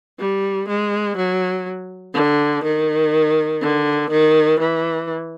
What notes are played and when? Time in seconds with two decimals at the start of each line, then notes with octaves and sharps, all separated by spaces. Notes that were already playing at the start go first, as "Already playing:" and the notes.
0.19 G3
0.68 G#3
1.17 F#3
2.14 D3
2.64 D#3
3.61 D3
4.10 D#3
4.59 E3